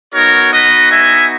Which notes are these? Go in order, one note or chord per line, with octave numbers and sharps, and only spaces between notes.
B3 D#4 F#4 A#4 C#5
B4 D#5
E5 G#5